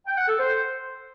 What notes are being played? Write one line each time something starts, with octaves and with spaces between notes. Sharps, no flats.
G5
F#5
A4
C5